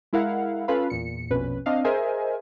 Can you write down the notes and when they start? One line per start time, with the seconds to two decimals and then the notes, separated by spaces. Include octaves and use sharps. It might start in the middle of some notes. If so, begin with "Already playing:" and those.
0.13 G#3 E4 A#4 F5 F#5
0.68 C#4 F4 A4 B4 F5 B5
0.90 E2 A#2 C#7
1.30 A#1 F2 B2 C#4 B4
1.66 C4 D4 D#5 F5
1.84 G#4 A#4 C5 D#5 E5 G#5